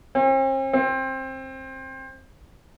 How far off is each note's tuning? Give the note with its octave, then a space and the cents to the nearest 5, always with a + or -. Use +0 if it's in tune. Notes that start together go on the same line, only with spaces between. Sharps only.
C4 +45
C4 +20